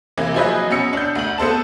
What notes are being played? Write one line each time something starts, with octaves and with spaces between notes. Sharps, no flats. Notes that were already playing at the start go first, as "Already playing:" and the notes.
C3 E3 A#3
F3 F#3 E4 G#4 B4 D#5
B2 C#4 E6 C#7
D4 G6
D2 F#7
B3 A4 C5 A5